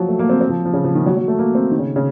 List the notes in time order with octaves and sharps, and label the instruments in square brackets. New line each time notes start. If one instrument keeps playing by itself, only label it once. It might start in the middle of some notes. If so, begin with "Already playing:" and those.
Already playing: [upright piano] F3 F#3
A3
A#3
C4
C4
F3
F3
C#3
F3
D#3
F#3
F#3
A3
A#3
C4
D#3
C#3
C#3